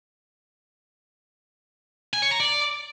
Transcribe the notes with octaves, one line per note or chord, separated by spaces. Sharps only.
G#5
C#5
A#5
D5